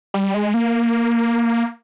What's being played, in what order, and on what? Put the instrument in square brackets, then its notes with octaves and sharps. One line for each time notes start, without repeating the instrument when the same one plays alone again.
[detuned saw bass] G3
G#3
A#3